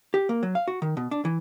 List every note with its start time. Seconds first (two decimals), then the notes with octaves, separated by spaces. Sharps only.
0.14 G4
0.29 A#3
0.43 F#3
0.55 F5
0.68 F#4
0.82 D#3
0.97 B2
1.11 D4
1.25 E3